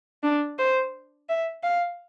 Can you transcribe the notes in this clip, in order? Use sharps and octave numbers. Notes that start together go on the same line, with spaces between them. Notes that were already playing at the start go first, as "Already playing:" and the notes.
D4
C5
E5
F5